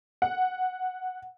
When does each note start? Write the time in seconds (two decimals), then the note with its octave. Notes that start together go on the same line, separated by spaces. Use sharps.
0.22 F#5